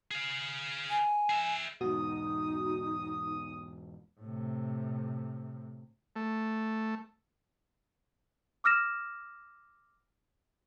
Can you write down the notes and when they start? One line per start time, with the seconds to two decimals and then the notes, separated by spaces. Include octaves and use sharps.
0.11 G#4 F5
0.89 G#5
1.30 G#4 E5
1.81 E2 G#2 B2 D#4 F#4 D#6
4.20 A2 C3
6.16 A3
8.64 D6 E6 F6 A#6 E7